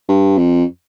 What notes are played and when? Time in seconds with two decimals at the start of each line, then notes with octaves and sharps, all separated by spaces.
0.09 G2
0.38 F2